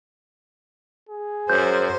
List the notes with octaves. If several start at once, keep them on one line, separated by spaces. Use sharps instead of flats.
G#4
F#2 C5 G6